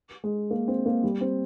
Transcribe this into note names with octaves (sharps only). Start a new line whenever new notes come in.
G#3
A#3
C4
A#3
G3
C4